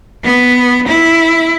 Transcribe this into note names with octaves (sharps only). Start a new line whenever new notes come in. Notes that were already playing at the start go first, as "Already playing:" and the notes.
B3
E4